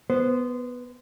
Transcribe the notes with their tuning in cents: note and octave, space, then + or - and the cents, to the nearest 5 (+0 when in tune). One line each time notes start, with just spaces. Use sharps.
B3 +0 C5 -20